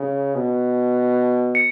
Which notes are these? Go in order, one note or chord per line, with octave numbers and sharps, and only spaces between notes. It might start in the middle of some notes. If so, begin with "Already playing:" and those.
Already playing: C#3
B2
C#7